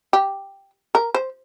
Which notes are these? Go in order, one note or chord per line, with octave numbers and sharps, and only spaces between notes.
G4
A#4
C5